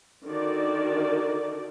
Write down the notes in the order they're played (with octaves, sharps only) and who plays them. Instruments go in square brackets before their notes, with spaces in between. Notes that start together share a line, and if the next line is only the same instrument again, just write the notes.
[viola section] D3 D#3 F#4 A#4 D5